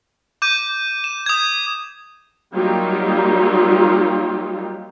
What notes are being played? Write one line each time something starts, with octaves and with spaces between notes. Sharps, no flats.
D6 G6 D#7
E7
D#6 G#6
F#3 G3 A#3 D#4 F4 G4